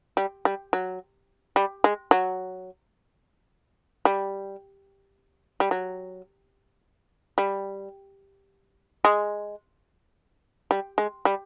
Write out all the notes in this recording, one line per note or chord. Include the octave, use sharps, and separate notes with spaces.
G3
G3
F#3
G3
G#3
F#3
G3
G3
F#3
G3
G#3
G3
G#3
G3